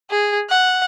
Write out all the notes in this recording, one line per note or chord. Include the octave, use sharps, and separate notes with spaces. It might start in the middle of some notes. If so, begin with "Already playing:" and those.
G#4
F#5